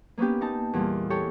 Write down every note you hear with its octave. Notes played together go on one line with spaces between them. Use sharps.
A#3 B3 C#4 D4 G4
D#4 A5
E2 A#2 G3
G4 A4 C#5